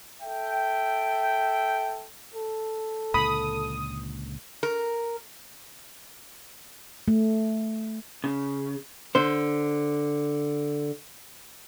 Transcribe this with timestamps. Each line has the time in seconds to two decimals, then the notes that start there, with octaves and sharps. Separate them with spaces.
0.22 A4 E5 G5
2.34 A4
3.14 C#2 A#2 D3 B5 D#6
4.63 A#4
7.08 A3
8.24 C#3
9.15 D3 C5